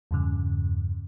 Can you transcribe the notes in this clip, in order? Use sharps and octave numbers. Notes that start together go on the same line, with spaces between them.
E2 G2 C#3